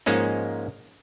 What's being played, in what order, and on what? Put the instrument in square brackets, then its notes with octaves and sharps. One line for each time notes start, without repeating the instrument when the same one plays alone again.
[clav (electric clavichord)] G#2 F3 G#3 A#3 C#4 D#4